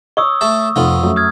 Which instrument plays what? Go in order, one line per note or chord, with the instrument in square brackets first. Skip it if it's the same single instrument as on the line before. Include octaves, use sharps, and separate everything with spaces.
[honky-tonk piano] C#5 [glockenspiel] C#6 D#6 E6
[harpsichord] A3 A4 E5
[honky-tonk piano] F1 [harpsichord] F2 B3 F4
[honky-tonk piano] F#2 A3
[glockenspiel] D#6 F6 G#6